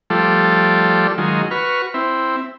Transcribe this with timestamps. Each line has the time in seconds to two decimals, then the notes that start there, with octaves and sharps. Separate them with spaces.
0.10 F3 G3 A3 F4 A4 D5
1.18 D#3 F#3 G#3 F4
1.51 F#4 B4 C#6 F6
1.94 C4 E4